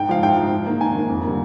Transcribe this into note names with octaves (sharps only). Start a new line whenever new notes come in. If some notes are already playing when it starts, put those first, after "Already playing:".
Already playing: G#2 G5
F3 G#3 F5
G#2 G5
F3 G#3
G#2
D#3 A#3
G#2 G#5
D#3 A#3
F2
D3 G3 A#3